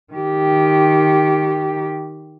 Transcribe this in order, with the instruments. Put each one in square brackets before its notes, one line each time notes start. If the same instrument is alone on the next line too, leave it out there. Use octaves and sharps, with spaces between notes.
[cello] D#3 G4